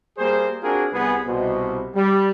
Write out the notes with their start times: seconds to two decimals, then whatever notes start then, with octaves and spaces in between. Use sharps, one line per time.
0.18 G3 A#3 G#4 C5
0.63 C4 D4 F4 F#4 G#4 A#4
0.92 C2 B3 G#4
1.27 C2 B2 C5
1.95 G3